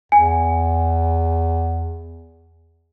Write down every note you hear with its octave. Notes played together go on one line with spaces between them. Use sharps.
E2 G#5